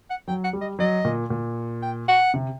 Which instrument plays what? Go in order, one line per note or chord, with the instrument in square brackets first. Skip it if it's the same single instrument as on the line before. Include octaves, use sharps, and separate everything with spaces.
[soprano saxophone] F#5
[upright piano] F#3 [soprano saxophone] G5
[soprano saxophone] F#5
[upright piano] G3
[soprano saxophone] D#5
[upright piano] F#3 [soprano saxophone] D#5
[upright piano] A#2
A#2
[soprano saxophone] G5
F#5
[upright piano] C3